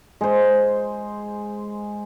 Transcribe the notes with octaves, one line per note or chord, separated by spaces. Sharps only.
G#3 C5